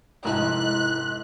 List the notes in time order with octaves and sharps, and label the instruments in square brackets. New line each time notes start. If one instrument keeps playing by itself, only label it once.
[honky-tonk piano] F1 G#2 D#5 [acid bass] E4 [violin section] F#6